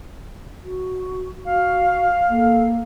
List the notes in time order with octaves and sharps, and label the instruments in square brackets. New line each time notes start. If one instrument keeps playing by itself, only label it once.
[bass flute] F#4
[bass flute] F#4 [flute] F5
[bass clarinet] A#3 [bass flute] A4